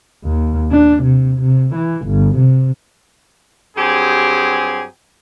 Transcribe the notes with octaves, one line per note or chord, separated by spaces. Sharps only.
D#2
D4
C3
C3
E3
G1
C3
G2 F#3 C4 G4 G#4